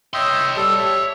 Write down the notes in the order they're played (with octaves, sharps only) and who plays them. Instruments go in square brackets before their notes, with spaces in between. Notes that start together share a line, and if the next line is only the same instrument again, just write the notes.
[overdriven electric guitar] C#5 C6 [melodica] D#5 E5 G5
[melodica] G3 A4
E5